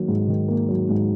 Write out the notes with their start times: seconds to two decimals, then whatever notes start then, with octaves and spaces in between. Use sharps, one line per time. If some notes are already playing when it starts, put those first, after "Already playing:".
Already playing: D#3 F#3 A#3
0.08 G#2
0.28 D#3
0.48 A#3
0.69 F#3
0.89 G#2